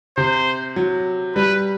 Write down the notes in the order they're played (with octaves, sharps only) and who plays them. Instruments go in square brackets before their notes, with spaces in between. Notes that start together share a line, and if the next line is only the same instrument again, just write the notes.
[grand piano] C3 [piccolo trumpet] C5
[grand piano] F#3
[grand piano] G3 [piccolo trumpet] B4